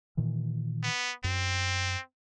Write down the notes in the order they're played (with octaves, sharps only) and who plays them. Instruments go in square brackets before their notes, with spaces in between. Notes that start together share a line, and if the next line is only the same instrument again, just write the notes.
[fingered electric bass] A#2 D#3 E3
[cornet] B3
[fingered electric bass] F#2 [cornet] C4